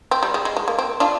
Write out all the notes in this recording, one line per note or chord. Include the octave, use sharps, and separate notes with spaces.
C4
G3
G#3
G#3
G#3
A#3
C4
D4 F4